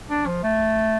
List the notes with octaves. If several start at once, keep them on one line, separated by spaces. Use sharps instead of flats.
D4
F3
A3